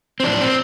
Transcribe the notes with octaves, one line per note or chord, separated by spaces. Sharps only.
C4
A2 F3 D4
C4